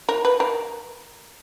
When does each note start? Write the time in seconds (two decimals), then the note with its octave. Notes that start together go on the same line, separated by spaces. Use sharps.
0.09 A#4
0.25 B4
0.40 A#4